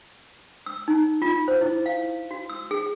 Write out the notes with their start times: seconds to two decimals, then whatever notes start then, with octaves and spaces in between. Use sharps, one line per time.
0.66 E6
0.88 D#4
1.22 F4
1.48 C5
1.61 E4
1.86 F5
2.31 F#4
2.50 E6
2.71 G#4